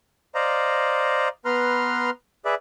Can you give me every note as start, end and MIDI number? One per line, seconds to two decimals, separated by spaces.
0.35 1.28 72
0.35 1.28 74
0.35 1.28 75
0.35 1.28 77
0.35 1.28 82
1.45 2.10 59
1.45 2.10 71
1.45 2.10 82
1.45 2.10 84
1.45 2.10 89
2.45 2.55 68
2.45 2.55 71
2.45 2.55 74
2.45 2.55 76